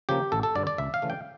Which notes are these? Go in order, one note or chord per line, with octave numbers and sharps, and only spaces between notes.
C#3 F3 A#3 G4
A1 A4
A4
G2 D3 D5
D5
C#2 E5
F5
C#3 E3 A3
G5